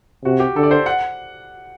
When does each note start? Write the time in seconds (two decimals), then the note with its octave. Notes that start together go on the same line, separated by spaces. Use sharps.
0.25 C3 F#4
0.40 G4
0.56 D3 A4
0.63 D5
0.71 C5
0.86 F#5